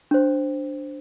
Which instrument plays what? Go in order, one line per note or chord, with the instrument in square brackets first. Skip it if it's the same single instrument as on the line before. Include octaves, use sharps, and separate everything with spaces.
[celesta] D4 C5